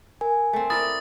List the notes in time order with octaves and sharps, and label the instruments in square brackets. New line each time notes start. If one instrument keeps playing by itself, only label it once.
[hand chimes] A#4 G#5
[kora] A3 C4
[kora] E4 A#4 D5 [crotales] D#6 A6